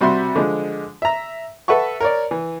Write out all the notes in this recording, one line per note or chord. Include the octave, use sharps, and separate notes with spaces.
C3 G3 F#4 E5 C6
D3 F3 G#3
E5 A#5
A4 B4 E5 F#5 C#6
A#4 C#5 D5
E3